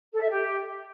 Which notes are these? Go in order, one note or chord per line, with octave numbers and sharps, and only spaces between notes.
A4
E5
G4